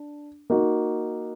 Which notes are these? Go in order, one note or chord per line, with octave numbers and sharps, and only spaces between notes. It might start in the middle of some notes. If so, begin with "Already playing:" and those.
Already playing: D4
A#3 D#4 F#4